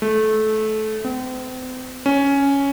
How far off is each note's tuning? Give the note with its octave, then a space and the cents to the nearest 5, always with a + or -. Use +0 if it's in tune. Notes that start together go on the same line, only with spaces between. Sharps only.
A3 -20
C4 -40
C#4 +5